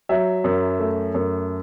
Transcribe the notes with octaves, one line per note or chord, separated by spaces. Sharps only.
F#3 E5
F#2
A3
F#2